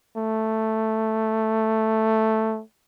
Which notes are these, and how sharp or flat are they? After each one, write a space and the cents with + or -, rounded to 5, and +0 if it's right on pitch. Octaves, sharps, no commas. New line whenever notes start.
A3 +5